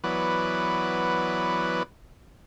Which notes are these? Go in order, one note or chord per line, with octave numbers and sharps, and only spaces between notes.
E3 F#3 B3 B4 D5